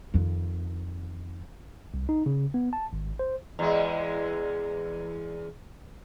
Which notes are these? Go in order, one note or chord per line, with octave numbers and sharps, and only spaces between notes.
F2 D#3
C2
D#4
C#3
B3
A5
G#1
C5
E2 G#3